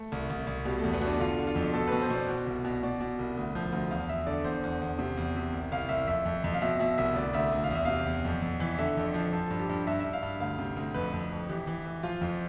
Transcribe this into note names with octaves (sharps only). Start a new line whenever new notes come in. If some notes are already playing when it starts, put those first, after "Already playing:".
Already playing: A3
C2
C2
C2
B2 G3
E2 A3
B3
B2 D4
D3 F4
D3
F4
F2
B2 A4
B2 B4
C5
B2 D5
B2
C2
B2
B2 D5
B2
C2
D2
F3
D2
E2 F5
E2 E5
D3 D5
E2 C5
E2
E2
C3
E2
C3
C2
C2 F5
C2 E5
F2 E5
F2
F2
F5
B2 E5
B2 E5
C2 E5
D2 D5
D2 E5
D2
F5
E2 E5
C3 F5
E2
F2
F2
E3
D3 E5
F2
F3
F3 A4
G2
G4
G2
G2 E5
G2 E5
F5
G2
D2 F5
C3
D2
F2 B4
F2
F2
E3 G4
E3
E3
F3 F4
F2 F4